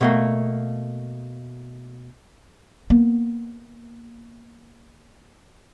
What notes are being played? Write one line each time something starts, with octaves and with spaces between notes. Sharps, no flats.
B2 A3 A#3
A#3 B3